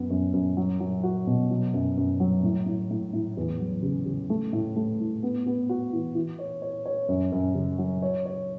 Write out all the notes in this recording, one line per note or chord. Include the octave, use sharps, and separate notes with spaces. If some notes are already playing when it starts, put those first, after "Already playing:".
Already playing: F#2 B3
F#2
F#2
F#3
F#3
F#4
B2
F#3
F#2
F#2
F#3
A2
A2
A2
A2
E2
F#3
C#3
C#3
A3
A2
A3
A2
B3
B3
F#4
E3
E3
C#5
C#5
C#5
F#2
F#2
C#3
F#3
C#5
C#5